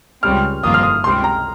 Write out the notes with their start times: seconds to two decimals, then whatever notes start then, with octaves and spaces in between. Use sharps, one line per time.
0.22 C#2 C#3 G3 C4 F6
0.63 G1 F2 D#3 A#3 F4 D#6
0.74 F6
0.83 D#6
1.04 C#2 C3 G3 C4 C6
1.24 A#5